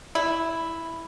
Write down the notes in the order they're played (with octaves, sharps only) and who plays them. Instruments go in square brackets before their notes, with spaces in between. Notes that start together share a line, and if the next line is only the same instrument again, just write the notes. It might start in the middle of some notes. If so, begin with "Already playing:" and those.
[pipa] E4